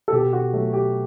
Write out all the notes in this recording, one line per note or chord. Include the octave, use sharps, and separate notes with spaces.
A4
B2 G4
F#4
F#3 A3
G4